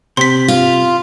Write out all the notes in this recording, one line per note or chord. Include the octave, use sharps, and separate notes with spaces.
C3 C6 B6
F4